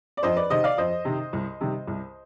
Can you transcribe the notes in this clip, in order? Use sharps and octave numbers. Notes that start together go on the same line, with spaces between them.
D5
F2 C5 D#5
B4 D5
C3 D#3 C5 D#5
D5 F5
F2 C5 D#5
C3 D#3
C2
C3 D#3 G3
C2